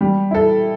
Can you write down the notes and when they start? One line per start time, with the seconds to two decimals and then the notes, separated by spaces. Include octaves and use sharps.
0.01 G3
0.31 E4 A4